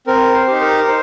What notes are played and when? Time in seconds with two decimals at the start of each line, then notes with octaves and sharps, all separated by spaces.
0.07 C4 A#4
0.34 C5
0.47 D#4 G4
0.61 A#4
0.88 C5